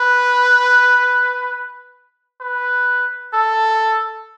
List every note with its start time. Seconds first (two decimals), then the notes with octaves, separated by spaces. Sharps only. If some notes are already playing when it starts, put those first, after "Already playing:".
Already playing: B4
2.41 B4
3.34 A4